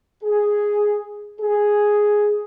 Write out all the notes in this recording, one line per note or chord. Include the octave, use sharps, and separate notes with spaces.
G#4
G#4